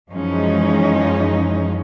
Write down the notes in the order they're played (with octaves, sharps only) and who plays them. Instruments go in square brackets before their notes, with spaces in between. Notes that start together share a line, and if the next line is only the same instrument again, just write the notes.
[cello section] F#2 E3 F3 G#3 C#4 D#4